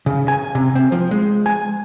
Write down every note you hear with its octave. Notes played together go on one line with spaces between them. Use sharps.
C#3
G#5
C3
C4
F3
G#3
G#5